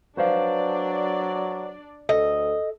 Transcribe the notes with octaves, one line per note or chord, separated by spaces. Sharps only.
F#3 D4 B4 C5 D5 F5
D2 A4 D#5